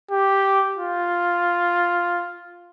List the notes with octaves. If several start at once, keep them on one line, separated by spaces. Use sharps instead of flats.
G4
F4